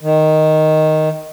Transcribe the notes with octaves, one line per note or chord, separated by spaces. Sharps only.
D#3